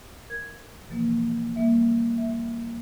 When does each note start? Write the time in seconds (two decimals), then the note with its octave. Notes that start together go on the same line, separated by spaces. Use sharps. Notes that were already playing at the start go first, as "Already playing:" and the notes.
0.30 A#4 G#6
0.88 B2 E3 F3 A#3
1.56 G3 A#3 E5
2.18 E5